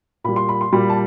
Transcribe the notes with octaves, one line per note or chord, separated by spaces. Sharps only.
A#2 G3 B5
C6
B5
C6
A#2 G3 B5
A5